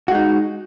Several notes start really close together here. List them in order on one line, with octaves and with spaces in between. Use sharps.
F#4 G#3 D#4